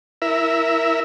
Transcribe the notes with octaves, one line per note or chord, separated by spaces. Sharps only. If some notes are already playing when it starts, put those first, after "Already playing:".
E4 A#4 E5